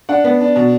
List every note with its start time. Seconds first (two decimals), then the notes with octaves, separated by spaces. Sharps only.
0.09 D4 F#5
0.24 B3
0.41 D4
0.56 B2